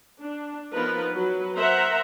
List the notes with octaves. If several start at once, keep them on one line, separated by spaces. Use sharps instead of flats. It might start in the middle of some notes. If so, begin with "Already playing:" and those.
D4
F3 B3 D#4 F4 A#4 B4
F#3 B4
A#4 C5 E5 F#5 A#5 C6